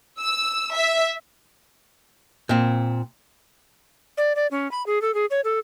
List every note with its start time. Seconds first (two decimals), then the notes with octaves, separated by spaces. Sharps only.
0.20 E6
0.74 E5
2.49 A#2 C4
4.17 D5
4.36 D5
4.51 C#4
4.71 B5
4.86 G#4
5.02 A4
5.14 G#4
5.31 C#5
5.44 A4